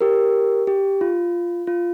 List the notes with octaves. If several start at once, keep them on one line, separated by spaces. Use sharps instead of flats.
G4 A#4
G4
F4
F4